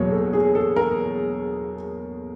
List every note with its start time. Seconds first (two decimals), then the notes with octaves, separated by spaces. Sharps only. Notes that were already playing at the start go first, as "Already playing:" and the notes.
Already playing: E2 B2 F#3 A#3 C#5
0.12 A4
0.33 G#4
0.55 A4
0.76 A#4